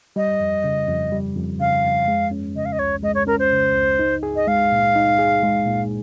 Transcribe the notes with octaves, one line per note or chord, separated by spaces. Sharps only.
G3 D#5
F2
C#3
F2
G3
F2
C#3 F5
F2
G#3
C#4
C#3 D#5
F5
D#5
C#2 C#5
G#3 D#5
C#5
C#4 A#4
C5
C#3
C#2
D#4
G#4
D#5
G#3 F5
A#2
D#4
G#4
G#3
A#2